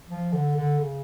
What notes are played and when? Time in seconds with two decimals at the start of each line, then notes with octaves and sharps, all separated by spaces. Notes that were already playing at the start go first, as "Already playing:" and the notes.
0.09 F3
0.33 D3
0.57 D3
0.80 C#3